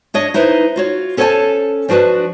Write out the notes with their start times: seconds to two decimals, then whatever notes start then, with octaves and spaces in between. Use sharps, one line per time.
0.14 D4 C#5 D#5
0.34 D#4 E4 B4 C5
0.76 F4 F#4 C#5
1.17 C#4 A4 C5 C#5 G#5 A5
1.89 F3 D4 F#4 B4 A5